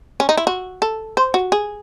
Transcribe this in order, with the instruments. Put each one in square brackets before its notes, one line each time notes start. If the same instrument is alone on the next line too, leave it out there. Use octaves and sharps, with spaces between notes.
[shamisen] C#4
D#4
E4
F#4
A4
C5
F#4
G#4